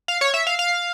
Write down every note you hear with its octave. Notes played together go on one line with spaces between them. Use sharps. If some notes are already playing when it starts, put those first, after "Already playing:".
F5
C#5
E5
F5
F5